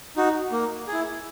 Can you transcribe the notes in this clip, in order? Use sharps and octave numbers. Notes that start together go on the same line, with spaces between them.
D#4 F#4
A#3
E4 G#4